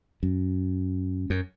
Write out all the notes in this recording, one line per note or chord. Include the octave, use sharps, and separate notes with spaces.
F#2
F#2